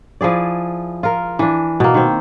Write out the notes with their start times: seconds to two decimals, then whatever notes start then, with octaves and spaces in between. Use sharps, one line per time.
0.21 F3 E4 G#4 D5
1.03 F4 A#4
1.39 E3 D4
1.80 B2 A#3
1.94 D#3 C4